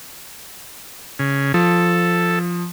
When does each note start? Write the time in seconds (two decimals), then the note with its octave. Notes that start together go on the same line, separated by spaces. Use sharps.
1.19 C#3
1.54 F3 A4